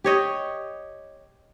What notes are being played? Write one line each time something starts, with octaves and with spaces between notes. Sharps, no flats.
G4 C#5 D#5